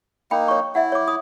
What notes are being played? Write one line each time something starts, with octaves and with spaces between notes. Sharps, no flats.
A#3 D#4 G5 B5
C#5 C#6
E4 E5 F#5
C#5 D6
D#6